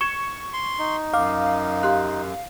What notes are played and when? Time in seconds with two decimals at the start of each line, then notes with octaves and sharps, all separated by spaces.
0.01 C#6 G#6 E7 G7
0.53 C6
0.79 D#4
1.14 F#2 F5 D6
1.83 G4 C6 F#6